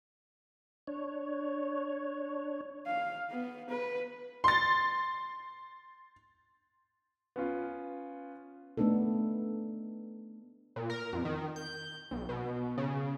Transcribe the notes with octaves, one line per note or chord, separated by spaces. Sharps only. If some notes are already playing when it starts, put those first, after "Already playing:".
D4 C#5
F5
B3
B4
C6 A6
B3 C#4 F4
A3 B3 D4 D#4 A4
A#2
A#4
F2
D#3
G6
B1
B2
C#3